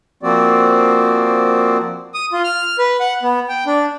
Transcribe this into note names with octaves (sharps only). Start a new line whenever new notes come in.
F3 A#3 C4 F#4 D5
D#6
F4
F6
B4
F#5
B3
G5
D4